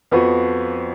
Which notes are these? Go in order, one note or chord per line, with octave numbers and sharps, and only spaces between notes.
F2 F3 B3 F#4 B4